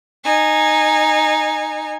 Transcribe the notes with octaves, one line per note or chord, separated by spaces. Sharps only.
D#4 G#5